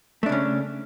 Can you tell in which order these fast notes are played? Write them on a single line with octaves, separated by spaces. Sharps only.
A3 D4 C#3 C#4